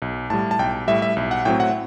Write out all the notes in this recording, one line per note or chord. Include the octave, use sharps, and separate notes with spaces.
B1
A2 G3 A5
A5
B1 G5
A2 G3 E5
E5
B1
F#5
A2 F#3 C4 G5
F#5